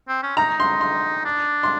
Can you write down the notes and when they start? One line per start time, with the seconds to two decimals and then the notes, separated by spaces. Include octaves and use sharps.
0.08 C4
0.23 C#4
0.37 D#4 A#5
0.60 C6
0.81 C6
1.25 D4
1.63 C6